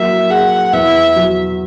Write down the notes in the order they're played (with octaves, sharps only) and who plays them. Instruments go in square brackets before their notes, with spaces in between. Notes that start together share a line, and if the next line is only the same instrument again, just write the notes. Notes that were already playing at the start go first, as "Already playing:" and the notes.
Already playing: [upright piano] F#3 A#3 E4 [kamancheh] E5
[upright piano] G#4 [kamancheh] F#5
[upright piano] E2 [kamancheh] E5
[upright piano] F#3